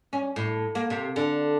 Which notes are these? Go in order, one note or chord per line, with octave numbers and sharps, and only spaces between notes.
C#4
A2
A#3
C3
D3